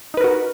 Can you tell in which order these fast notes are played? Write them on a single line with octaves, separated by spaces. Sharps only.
D#4 B4 A#4 F#4